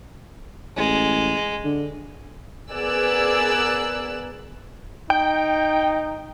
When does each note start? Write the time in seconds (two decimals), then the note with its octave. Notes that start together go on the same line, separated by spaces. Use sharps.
0.77 A1 G#3
1.64 D3
2.71 B3 G#4 A#4 D5 E6 F#6
5.10 D#4 G5